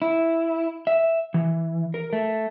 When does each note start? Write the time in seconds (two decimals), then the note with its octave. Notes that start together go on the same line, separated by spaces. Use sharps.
0.02 E4
0.87 E5
1.34 E3
1.94 A#4
2.13 A3